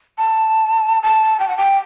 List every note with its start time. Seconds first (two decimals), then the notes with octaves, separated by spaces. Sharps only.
0.18 A5
1.03 A5
1.40 G5
1.48 F#5
1.57 G5